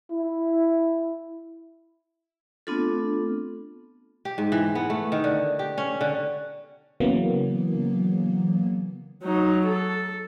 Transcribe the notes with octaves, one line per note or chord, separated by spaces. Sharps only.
E4
A3 B3 C4 D4 F4 A4
G4
G#2
E3
B3
A3
D#3
D3
G4
C#4
D3
C#3 E3 F#3 A#3 B3
F#3 D#4
A4